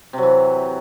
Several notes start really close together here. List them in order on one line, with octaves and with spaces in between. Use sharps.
C3 F#3 E3